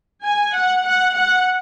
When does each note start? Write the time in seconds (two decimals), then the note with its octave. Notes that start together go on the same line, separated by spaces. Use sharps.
0.24 G#5
0.54 F#5
0.85 F#5
1.14 F#5